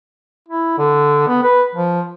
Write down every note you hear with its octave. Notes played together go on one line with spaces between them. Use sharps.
E4
D3
B3
B4
F3